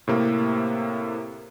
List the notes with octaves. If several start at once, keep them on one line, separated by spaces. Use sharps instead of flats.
A2 C3 A#3